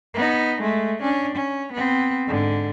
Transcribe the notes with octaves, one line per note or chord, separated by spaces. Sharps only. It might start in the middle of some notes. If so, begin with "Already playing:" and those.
B3 D#4
G#3 A3
C#4 D4
C#4
B3 C4
G#2 D3